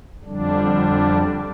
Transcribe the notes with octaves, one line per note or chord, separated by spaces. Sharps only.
F2 D3 G3 D4